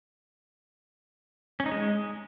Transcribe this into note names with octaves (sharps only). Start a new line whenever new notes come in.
C#4
D#4
G#3